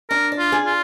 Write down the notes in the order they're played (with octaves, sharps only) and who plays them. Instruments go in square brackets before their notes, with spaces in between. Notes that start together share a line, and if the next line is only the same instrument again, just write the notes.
[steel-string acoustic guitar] D4 [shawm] A#4
[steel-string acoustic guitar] D5
[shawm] F4
[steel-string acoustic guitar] G#4
[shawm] F4